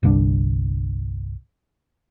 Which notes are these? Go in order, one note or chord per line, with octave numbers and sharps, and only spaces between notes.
G1 C2 G2 D4